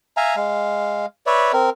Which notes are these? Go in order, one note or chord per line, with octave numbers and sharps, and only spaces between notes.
E5 F5 G#5 A#5
G#3 F5
B4 C#5 D5 E5
C4 A#4